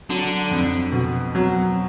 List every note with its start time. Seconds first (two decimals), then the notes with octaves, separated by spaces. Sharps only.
0.09 D3 F#3
0.51 F2
0.92 B2
1.35 F#3